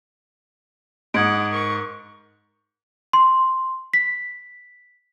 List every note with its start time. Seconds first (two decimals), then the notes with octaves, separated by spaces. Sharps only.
1.14 G#2 F#5 D#6 G#6 D7
1.51 A#4 C#6
3.13 C6
3.94 B6